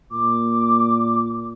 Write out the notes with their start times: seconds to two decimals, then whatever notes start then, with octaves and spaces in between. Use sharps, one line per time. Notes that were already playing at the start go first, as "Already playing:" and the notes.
0.11 A#2 D6